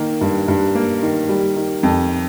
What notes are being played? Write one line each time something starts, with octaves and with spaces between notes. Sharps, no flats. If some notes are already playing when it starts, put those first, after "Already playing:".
Already playing: D#3 A#3
G2
G2
A#3
D#3
G3
D#3
F2